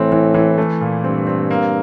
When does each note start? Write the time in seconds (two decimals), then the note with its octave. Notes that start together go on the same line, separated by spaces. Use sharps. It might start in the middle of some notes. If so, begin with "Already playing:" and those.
Already playing: A2 E3 C4
0.12 E3
0.34 E3
0.58 A3
0.81 A#2
1.04 G2 C4
1.27 C4
1.51 A#3